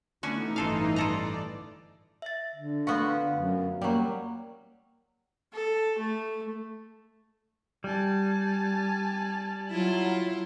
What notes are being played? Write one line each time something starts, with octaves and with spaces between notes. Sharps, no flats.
D3 E3 A3 B3 C#4 D#4 F#4
A1 G2 F4 A4 F5
F4 A4 D5 A#5
E5 A6
D3
A3 B3 F4 F#4 F5
F#2
F#3 G3 A#3
A4
A3
G3 G#5 A5
F#3 E4 F4